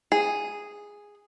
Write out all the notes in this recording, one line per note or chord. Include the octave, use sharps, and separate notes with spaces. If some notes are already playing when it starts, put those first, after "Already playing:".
G#4